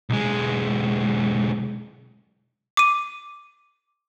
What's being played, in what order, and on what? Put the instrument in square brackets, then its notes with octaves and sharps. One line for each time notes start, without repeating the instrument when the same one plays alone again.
[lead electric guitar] B1 G#3
[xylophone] D6 D#7